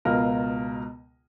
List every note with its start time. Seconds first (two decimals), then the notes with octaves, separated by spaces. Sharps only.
0.05 C#2 B2 F4 A#4